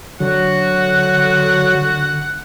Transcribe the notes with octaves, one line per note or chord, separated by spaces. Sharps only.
D3 F#3 F#4 F#5